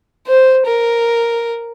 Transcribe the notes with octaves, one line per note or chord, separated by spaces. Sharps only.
C5
A#4